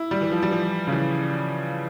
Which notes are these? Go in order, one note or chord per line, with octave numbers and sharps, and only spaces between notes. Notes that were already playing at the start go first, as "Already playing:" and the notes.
Already playing: E4
G3
E3
F3
G3
F3
C#3
E3